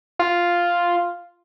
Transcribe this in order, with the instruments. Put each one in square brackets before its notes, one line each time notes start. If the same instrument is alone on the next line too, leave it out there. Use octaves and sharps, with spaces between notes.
[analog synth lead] F4